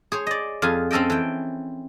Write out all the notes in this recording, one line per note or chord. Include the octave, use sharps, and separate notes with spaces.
G#4 C5 C#5
D5 D#5
F2 F4 G#4 G#5
C4 C#4 A4 D#5 G5
E3 G5